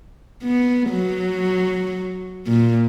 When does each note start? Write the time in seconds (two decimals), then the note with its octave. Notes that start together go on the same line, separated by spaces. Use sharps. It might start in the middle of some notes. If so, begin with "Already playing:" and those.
0.43 B3
0.89 F#3
2.47 A#2